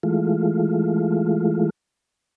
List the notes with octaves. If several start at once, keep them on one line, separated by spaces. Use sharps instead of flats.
E3 G#3 A3 F4